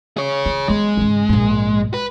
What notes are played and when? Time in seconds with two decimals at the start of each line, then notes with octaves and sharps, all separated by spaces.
0.17 G#4 C#5
0.46 F4
0.68 F#3 G#3 B3
0.97 G#2 C#3
1.29 A#1 G#2
1.94 B4